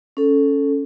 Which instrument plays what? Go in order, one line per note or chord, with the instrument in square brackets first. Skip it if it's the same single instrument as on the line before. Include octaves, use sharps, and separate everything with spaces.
[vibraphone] C#4 A4